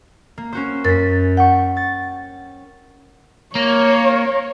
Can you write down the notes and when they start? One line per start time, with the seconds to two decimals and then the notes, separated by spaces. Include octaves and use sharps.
0.38 A#3
0.53 C#4 F#4 C5
0.84 F#2 A#4 A6 B6
1.37 F#5 G5 C#6
1.77 A6
3.55 A#3 C#5